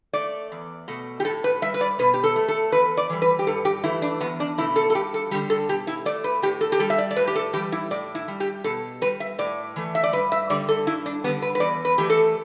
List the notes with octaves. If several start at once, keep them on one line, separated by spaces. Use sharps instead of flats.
A3 D5
E2
B2 A3
G4
A2 A4
B4
G3 E5
B4
D5
B2 B4
G4
A4
A3
A4
E2 B4
D5
E3 G3
B4
G4
G2 A4
G4
E3 A3 E4
D4
E2 B3
D4
B2 A3 E4
A4
A4
G2 G4
A4
D3 G3 G4
A4
B2 G4
E4
A3 D5
B4
A2 G4
A4
G4
G3 A4
E5
D5
D5
A2 B4
G4
A4
E3 G3 G4
E4
A2 D5
E4
G3
G4
B2 A4
G3 B4
E5
A2 D5
E3 A3
E5
D5
G2 B4
E5
D3 G3 D5
A4
G2 E4
D4
D3 G3 B3
B4
B4
E2 D5
B4
E3 A3 G4
A4